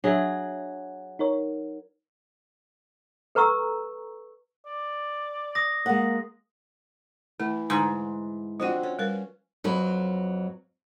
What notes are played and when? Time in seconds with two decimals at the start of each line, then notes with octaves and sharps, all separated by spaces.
0.04 F#3 D4 G#4 E5
1.19 D#4 A#4 C#5
3.35 A4 B4 A#5 C#6 E6
4.66 D5
5.55 D#6 A#6
5.86 G#3 A#3 F#5
7.40 E3 A3
7.70 G#2 D3
8.60 F3 C4 D4 F4 F#4
8.83 C#4
8.99 G3 A#4 B4
9.64 F2 F#3 B4